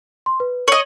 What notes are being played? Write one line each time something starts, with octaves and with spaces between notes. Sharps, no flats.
C6
B4
C#5 D#5 F#7